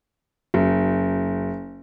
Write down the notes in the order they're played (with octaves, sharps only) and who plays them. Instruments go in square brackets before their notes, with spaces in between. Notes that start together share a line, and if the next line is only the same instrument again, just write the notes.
[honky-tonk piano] F#1